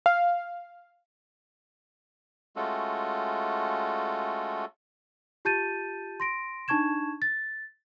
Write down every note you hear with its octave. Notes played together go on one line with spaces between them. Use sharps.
F5
G#3 A3 C#4 F4 F#4 A4
F4 G4 A5 G6 A6 D#7
C6 A#6 D7
D4 D#4 A5 C#6 G#6 E7
A6